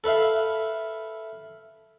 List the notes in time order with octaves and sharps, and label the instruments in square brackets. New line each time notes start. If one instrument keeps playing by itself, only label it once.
[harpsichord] A4 B4 E5 F5